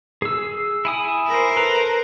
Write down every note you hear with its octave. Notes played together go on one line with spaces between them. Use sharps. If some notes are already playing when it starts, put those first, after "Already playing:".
G#4 E6
E4 G#5 D#6
A#4 C5
A4 B4 A#5